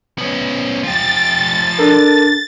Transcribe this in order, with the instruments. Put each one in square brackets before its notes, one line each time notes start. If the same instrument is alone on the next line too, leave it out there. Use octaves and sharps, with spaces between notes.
[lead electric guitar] B3 C#4
[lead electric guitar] F3 G4 [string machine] A6
[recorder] D4 [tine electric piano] A4 A#4